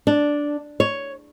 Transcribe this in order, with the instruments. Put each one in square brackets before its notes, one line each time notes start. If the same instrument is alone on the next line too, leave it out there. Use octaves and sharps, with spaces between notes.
[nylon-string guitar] D4
C#5